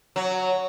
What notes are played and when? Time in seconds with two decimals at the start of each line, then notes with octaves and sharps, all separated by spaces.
0.16 F#3